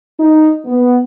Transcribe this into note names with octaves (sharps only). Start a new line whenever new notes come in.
D#4
B3